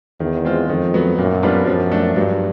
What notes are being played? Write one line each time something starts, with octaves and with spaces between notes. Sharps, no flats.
E2 D#3
G#3 C4 F4
F2 D#3
F#3 B3
F#2 A#2
G3 B3 D4 F4
F#2 F3
A3 D4
G2 F#3